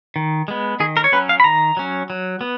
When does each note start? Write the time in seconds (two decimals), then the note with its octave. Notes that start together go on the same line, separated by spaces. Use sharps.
0.16 D#3
0.48 G#3 B3
0.80 D#3 G#4
0.97 A#4
1.04 C#5
1.12 F#3 C#4 B4
1.29 F5
1.40 B5
1.44 D#3 A#5
1.77 F#3 C#4
2.10 F#3
2.41 B3